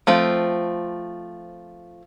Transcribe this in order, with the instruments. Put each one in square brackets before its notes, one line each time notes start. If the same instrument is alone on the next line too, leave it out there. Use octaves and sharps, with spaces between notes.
[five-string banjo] F3 A3 C4